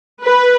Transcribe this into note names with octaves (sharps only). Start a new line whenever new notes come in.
B4